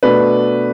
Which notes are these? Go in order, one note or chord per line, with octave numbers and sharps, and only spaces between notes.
B2 A3 D4 B4